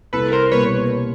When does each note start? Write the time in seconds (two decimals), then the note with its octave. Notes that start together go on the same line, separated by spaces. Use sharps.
0.13 C2 A4 B4
0.32 A#4 C5
0.51 B2 G3 A#3 B4 C#5